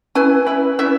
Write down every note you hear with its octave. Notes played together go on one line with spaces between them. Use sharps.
C#4 E4 B4 G#5
C#4 E4 B4
C#4 E4 B4 E5